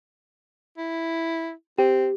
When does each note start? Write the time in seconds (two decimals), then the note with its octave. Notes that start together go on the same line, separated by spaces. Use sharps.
0.78 E4
1.78 C4 G4